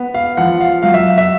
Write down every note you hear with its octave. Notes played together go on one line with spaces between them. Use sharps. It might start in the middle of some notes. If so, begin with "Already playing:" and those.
Already playing: B3
F5
F3 F#5
F5
F#3 F5
E5
E5